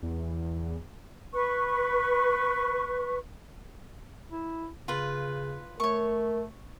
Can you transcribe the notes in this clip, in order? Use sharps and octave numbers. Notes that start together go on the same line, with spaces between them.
E2
B4 C#6
E4
C#3 F4 B4
A3 A#4 C#5 C#6